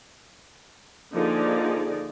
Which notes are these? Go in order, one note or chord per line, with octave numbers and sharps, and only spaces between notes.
D3 F3 A#3 D#4 G#4 D5